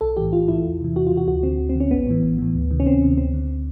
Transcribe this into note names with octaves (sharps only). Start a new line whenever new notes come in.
B1 A4
A2 E3 G4
B1 F4
A2 E3 E4
E2
C3 E3
E2 F#4
F4
C3 E3
F#4
D2 F#4
D3 C4
D2
C4
D3 C#4
A1 B3
A2 E3
A1
A2 E3
D2
C3 D#3
C#4
D2 C4
C3 D#3
D2 C4
D3